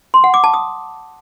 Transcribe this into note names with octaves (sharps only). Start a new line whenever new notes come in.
C6
F#5
D6
A5
D#6